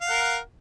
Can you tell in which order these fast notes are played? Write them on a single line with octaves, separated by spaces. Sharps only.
F5 F#5 A#4